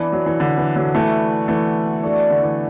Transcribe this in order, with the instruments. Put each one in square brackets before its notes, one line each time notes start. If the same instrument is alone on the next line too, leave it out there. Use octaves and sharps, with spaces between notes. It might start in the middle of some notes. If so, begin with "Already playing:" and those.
Already playing: [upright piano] E3 [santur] B3 D4 B4 D5
[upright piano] F#3
E3
D3
E3
D3 F#3
[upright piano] E3 A3 [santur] B3 F#4 A4 E5
[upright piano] E3 A3
[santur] D4 F#4 A4
[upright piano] D3
E3